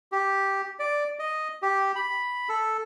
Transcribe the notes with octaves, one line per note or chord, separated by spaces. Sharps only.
G4
D5
D#5
G4
B5
A4